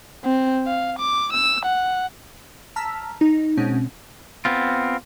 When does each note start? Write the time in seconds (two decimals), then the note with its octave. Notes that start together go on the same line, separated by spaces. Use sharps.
0.24 C4
0.66 F5
0.99 D6
1.33 E6
1.65 F#5
2.76 A5 A#5 E6 F6 B6
3.21 D#4
3.57 B2 G#3 C4 C#4
4.45 B3 C4 F4